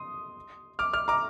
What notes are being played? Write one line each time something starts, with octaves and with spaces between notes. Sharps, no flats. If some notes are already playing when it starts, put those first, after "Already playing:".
Already playing: C6 D#6
D6 F6
D6 F6
A#5 D6